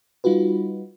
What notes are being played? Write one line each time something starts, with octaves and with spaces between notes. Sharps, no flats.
G3 D#4 F4 F#4 B4